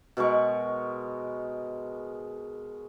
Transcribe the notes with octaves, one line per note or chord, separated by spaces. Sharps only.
B2 G#3 A#4 C#6